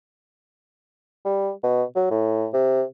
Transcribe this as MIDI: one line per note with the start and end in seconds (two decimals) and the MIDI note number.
1.25 1.50 55
1.63 1.83 47
1.96 2.08 54
2.11 2.47 45
2.53 2.83 48